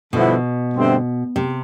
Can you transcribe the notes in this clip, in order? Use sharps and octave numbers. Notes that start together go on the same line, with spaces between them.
G2 B2 D3 F3 B3 E4
G2 D3 A3 C4
C3